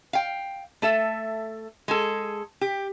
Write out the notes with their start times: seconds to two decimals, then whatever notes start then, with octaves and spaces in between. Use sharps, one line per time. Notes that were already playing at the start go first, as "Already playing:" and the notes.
0.13 F5 G5
0.82 A3 A4 E5
1.88 G#3 G#4 A4
2.61 G4